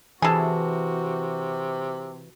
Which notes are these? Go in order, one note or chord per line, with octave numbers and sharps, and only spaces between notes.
C3 E3 F#4 G#4 A4